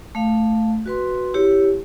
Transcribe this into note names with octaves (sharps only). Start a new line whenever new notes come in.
A3 F5
F#4 B4 C6
E4 G4 C#5